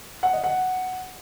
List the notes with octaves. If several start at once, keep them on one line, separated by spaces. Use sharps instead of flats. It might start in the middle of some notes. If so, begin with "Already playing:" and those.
F#5
D#5
F#5